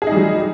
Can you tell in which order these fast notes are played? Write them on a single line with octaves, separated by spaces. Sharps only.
G#4 D#4 G3 F#3